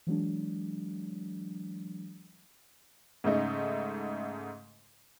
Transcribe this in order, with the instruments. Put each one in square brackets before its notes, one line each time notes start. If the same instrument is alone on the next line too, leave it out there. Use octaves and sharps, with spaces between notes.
[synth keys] E3 F#3 G#3 D4
[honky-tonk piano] G#2 C#3 A3 D#4